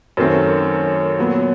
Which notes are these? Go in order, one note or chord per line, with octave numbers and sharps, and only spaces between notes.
F#2 D#3 F#3 A3 C4
A#2 F#3 B3